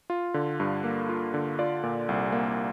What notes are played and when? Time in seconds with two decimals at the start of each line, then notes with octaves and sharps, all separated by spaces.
0.10 F4
0.34 D3
0.60 G2
0.84 A#3
1.09 F4
1.34 D3
1.59 F4 D5
1.83 A#2
2.09 C2
2.32 A#3